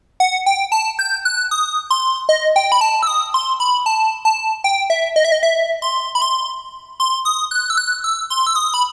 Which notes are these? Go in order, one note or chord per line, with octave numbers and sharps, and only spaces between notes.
F#5
G5
A5
G6
F#6
D#6
C6
D#5
G5
B5
A5
E6
D#6
C6
B5
A5
A5
G5
E5
D#5
E5
D#5
E5
C6
B5
C6
C6
D#6
F#6
E6
F#6
E6
C6
E6
D#6
B5